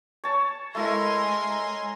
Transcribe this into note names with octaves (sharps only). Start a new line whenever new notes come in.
C#5 A5
G#3 A3 E4 A#4 G#5 A#5 C6